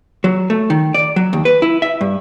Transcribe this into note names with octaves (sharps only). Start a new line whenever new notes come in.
F#3
A3
D#3
D5
F#3
D#2
B4
E4
E5
G2